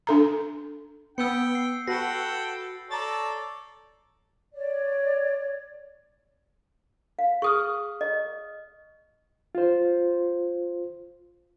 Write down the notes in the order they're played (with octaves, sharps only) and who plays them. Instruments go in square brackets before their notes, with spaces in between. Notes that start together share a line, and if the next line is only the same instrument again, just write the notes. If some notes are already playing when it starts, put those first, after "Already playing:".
[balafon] D4 A4 A#5
[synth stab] B3 [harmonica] G5 [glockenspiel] E6 G6 C#7
[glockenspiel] C7
[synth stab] F#4 B4 [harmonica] A4 F#5 G5 [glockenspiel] A#6 C7
[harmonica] A4 C#5 D5 [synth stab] A#5 A6
[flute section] C#5 D5
[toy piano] F5
[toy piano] G#4 [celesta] C#6 D#6 F6
[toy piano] D#5
[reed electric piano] F4 C5